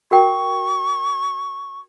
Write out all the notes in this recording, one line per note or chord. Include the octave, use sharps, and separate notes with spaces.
F#4 A#4 G5 C#6